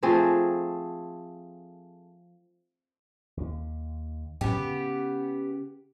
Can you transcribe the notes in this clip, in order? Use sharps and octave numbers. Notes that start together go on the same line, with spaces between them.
F3 A3 C4 G#4
D#2
A2 F#3 B3 C#4 G4
C#3